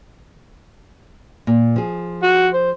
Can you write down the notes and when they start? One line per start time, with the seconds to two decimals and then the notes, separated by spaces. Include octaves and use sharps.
1.47 A#2
1.76 F3 G#4
2.23 F#4
2.54 C5